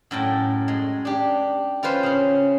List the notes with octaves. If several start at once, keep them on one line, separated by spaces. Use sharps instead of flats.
F#2 A2 A4 G5
G#3
D4 G4
C#4 F4 B4 C5
C#3 C#4